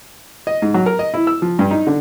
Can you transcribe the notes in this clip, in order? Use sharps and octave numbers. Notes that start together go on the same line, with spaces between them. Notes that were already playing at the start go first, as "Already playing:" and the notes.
D#5
G#2
F#3
A#4
D#5
E4
E6
F3
G2
D#4
D3